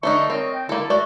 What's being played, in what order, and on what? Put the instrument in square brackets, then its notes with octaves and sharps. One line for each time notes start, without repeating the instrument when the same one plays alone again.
[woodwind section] D3 E5 C#6 [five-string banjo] A3 D4 D#4
[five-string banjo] C4 [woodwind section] A#4 C#5 D#5
[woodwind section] G5
[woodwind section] D3 E4 [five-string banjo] A#3 A4
[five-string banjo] A3 D5 [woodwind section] F#4